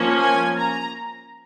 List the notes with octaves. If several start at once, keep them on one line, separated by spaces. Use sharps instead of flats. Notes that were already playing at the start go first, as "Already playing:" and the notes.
Already playing: F3 A#3 C#4
G#5
A#5